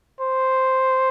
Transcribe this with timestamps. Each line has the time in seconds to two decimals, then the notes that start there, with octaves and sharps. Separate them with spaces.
0.20 C5